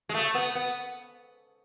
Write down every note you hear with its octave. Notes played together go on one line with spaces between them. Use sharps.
G#3
A3
B3
B3